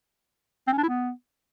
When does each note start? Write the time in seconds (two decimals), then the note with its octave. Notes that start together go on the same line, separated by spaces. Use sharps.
0.67 C4
0.72 C#4
0.78 D4
0.83 E4
0.88 B3